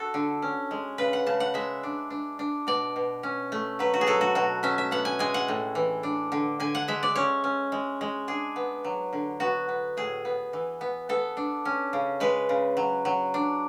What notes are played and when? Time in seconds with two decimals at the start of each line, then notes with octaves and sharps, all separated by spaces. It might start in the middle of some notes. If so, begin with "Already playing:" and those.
Already playing: F#4 A4
0.14 D3
0.42 C#4
0.71 G#3
0.98 C#3 B4
1.13 F#5
1.26 C#3 A5
1.40 F#5
1.54 G#3 E5
1.83 D4
2.10 D4
2.39 D4
2.67 B2 D5
2.96 B2
3.23 C#4
3.52 A3
3.79 F#3 B4
3.94 F#4
4.01 G#4
4.06 F#3 A4
4.21 F#4
4.35 B2 F#4
4.63 C#4 E5
4.78 E5
4.91 B3 F#5
5.05 G#5
5.19 G#3 G#5
5.34 F#5
5.48 A2
5.75 E3
6.03 D4
6.32 D3
6.60 D3 G#5
6.75 F#5
6.88 G#3 E5
7.03 D5
7.15 C#4 C#5
7.44 C#4
7.72 G#3
8.01 G#3
8.28 D4 G#4
8.56 B3
8.84 F#3
9.13 D3
9.40 B3 F#4
9.69 B3
9.97 A2 G#4
10.25 B3
10.53 E3
10.81 B3
11.09 B3 A4
11.37 D4
11.65 C#4
11.93 C#3
12.20 G#3 B4
12.49 C#3
12.77 F#3
13.05 F#3
13.34 D4